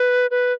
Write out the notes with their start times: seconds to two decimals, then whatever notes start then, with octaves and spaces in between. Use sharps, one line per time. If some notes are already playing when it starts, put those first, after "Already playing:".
Already playing: B4
0.31 B4